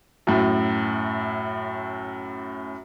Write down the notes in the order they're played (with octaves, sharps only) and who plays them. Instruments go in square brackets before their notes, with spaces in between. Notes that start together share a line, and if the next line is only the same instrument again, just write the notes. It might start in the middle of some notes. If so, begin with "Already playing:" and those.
[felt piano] F#2 A2